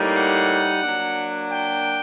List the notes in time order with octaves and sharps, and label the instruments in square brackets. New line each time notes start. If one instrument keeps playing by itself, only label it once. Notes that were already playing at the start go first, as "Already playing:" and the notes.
Already playing: [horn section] A2 G3 A#3 D#4
F#5
F#3 A#3 D4
G5